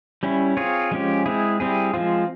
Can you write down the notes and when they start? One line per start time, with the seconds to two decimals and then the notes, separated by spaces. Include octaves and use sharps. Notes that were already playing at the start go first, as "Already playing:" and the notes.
0.23 G3 C#4 E4
0.57 C4 F4 G#4 C#5
0.91 F3 G#3 C#4 G4
1.26 G#3 C4 E4 G#4
1.60 G3 C4 E4 G#4
1.94 F3 G#3 C4 F4